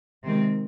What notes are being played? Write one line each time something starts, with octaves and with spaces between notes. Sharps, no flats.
C3 D#3 G#3 C4